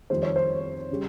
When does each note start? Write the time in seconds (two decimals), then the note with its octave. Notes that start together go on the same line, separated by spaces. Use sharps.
0.10 F2 D#3 G3 C5
0.22 C#5
0.36 C5
0.91 C#3 G3